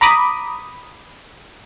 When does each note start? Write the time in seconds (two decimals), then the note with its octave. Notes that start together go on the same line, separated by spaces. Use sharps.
0.01 A#5 B5 D6 D#6